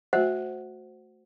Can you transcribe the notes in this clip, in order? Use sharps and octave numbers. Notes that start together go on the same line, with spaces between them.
A3 F#4 C5 E5 F#5